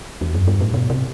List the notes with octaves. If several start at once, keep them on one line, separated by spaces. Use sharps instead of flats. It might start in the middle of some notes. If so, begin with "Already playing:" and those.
E2
F#2
G2
A2
B2
C3